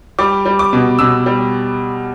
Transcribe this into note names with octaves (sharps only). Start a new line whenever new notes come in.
G3 D6
G3
D6
B2
B2 E6
G3